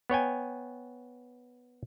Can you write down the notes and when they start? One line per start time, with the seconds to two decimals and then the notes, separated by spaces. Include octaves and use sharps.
0.10 B3 C#5 G5 G#5